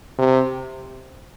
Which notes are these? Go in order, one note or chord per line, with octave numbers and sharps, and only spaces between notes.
C3